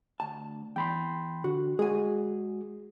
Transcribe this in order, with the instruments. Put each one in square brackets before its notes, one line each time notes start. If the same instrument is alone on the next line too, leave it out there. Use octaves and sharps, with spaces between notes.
[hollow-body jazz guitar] D2 A5
[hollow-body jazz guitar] E2 [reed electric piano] G5 B5 C6
[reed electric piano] D3 [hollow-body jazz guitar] F#4
[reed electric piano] G#3 F#4 [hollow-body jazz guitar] G#4 G#5